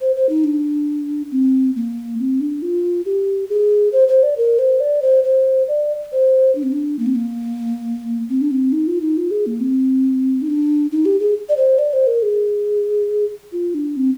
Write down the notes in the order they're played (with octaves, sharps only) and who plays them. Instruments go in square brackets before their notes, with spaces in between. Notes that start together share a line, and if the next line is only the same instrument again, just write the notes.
[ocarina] C5
C5
D#4
D4
C4
A#3
C4
D4
F4
G4
G#4
C5
C5
D5
A#4
C5
D5
C5
C5
D5
C5
D4
C4
D4
A#3
C4
A#3
C4
D4
C4
D#4
F4
D#4
F4
G#4
A#3
C4
D#4
D4
D#4
G4
G#4
D5
C5
D5
C5
A#4
G#4
F4
D4
C4